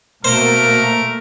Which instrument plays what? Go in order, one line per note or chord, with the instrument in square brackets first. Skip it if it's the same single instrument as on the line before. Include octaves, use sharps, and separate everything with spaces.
[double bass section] B2 A#3 [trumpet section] A3 A#4 [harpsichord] C5